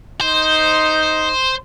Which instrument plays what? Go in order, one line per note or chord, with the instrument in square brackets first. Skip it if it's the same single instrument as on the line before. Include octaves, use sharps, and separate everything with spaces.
[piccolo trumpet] D#4 [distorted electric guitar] C5